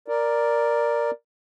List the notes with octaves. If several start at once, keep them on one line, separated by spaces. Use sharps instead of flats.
A#4 D5